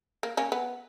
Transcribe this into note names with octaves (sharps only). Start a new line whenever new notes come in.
A#3
A#3 C#4
B3